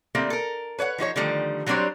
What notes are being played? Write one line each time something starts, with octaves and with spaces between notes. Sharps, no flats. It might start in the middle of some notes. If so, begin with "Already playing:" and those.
D3 G3 A3 A#3 C4
A4 A#4
B4 C#5 E5 F#5
F3 D#4 F#4 C#5
D3 D#3 F3 G3 A3
F#3 G3 C4 D4 C5 C#5